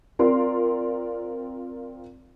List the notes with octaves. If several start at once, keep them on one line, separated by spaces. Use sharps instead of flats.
C4 F4 A#4 D5 C6